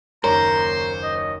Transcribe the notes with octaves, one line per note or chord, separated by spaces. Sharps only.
F#1 D#2 A#4 C5 C#5 A#5
D#5